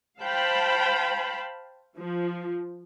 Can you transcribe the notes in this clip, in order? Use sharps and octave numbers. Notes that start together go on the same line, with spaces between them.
C5 F5 G5 A5 B5
F3